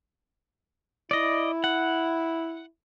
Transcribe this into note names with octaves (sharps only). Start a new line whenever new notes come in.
E4 D5 D#5
F#5